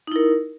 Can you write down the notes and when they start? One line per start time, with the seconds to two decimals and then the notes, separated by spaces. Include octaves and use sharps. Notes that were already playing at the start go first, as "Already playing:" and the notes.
0.07 D#4
0.12 E4
0.16 A#4